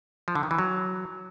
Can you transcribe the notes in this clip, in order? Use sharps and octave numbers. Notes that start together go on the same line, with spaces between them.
F3
D3
D#3
E3
F#3